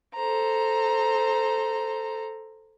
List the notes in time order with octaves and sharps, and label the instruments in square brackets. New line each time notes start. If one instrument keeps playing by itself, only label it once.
[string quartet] A4 C5 A#5